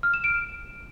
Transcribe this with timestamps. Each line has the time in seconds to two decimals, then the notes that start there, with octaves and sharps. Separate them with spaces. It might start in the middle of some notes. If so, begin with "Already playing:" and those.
0.03 F6
0.14 E7
0.24 D7